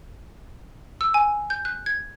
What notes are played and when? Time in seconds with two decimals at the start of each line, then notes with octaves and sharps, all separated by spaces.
1.01 E6
1.14 G#5
1.50 G6
1.65 F#6
1.86 G#6